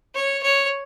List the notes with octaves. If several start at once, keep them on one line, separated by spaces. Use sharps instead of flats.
C#5
C#5